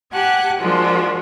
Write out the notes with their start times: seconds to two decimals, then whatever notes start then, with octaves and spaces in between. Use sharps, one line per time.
0.12 G4 F#5 G#5 A5 F#6
0.59 F3 G#3 A#3 D4 F4 F#4